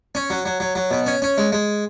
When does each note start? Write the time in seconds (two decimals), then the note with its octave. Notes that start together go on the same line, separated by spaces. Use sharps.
0.15 C#4
0.30 F#3
0.45 F#3
0.60 F#3
0.75 F#3
0.91 B2
1.07 C#4
1.22 C#4
1.38 G#3
1.52 G#3